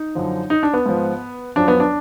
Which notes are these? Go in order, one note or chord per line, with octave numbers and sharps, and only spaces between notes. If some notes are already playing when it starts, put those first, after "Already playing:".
Already playing: D#4
F#2 D3 F3
D#4
D4
B3
G#2 F3
F#2 F3 D4
B3
D4